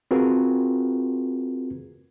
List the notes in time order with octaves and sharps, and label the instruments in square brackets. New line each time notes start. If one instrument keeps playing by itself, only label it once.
[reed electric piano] C4 F4 F#4 G#4 A#4 B4